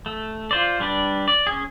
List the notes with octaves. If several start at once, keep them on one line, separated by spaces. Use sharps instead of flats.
A3
F4 C5 D5
G3 D4 B4 D5
D5
C#4 G#4